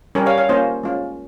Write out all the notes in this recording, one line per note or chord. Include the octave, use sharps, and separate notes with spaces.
G3 C#4 G4 A#4 C#5
C#5 F5
C#5 F5
A#3 C#4 F4 C5 D#5
G#3 C#4 F4